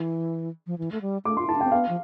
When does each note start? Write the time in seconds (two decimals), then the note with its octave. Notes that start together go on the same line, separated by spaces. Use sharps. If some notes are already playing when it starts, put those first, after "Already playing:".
Already playing: E3
0.67 F3
0.78 E3
0.92 A3
1.01 G3
1.25 A3 D6
1.37 F4 C6
1.47 E4 A5
1.55 D4
1.61 C4 G5
1.72 B3 F5
1.89 F3